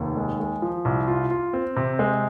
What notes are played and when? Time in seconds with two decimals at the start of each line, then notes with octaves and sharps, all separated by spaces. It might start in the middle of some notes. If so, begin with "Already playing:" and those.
Already playing: F1 D#2
0.17 G#3
0.40 G#3
0.62 F3
0.85 C2
1.08 F4
1.31 F4
1.53 C4
1.76 C3
1.99 G#3